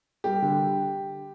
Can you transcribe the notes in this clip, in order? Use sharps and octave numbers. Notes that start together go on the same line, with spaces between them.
G3 G4
D3